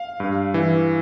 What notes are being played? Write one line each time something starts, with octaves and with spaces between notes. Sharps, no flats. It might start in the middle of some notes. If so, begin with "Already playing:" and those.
Already playing: F5
G2
E3